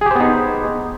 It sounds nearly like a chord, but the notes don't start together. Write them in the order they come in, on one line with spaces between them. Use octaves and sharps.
G#4 G4 C5 B3 D#4